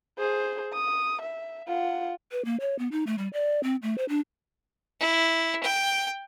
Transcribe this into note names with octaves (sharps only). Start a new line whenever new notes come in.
G#4 C5
D#6
E5
F4 F#5
B4
A#3
C#5
B3
D#4
A3
G3
D5
C4
A3
C5
D4
E4
G5